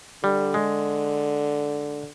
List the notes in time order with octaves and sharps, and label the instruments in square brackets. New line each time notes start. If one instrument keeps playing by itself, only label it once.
[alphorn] D3 [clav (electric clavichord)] G3
[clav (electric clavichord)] G#3